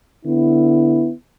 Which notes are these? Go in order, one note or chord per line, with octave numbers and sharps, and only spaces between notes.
D3 B3 E4